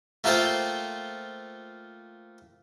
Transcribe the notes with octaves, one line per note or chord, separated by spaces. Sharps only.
A3 A#3 F4 A4 C5 G5